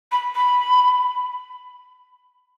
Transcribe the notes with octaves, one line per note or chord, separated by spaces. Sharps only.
B5
B5